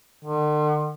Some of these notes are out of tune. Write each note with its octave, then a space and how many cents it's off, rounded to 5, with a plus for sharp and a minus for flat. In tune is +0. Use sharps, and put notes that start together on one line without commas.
D3 +45